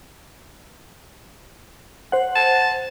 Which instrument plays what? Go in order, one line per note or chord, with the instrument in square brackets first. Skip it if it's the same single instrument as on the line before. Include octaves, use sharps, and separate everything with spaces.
[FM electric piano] C5 F#5
[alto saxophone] A5